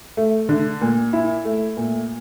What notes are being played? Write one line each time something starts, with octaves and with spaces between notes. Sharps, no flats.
A3
D3
A#2
E4
A3
A#2